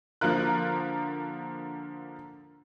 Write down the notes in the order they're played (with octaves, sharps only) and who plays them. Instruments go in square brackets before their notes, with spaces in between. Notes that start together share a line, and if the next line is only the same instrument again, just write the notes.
[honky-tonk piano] D3 F3 A#3 F4 A#4 F#6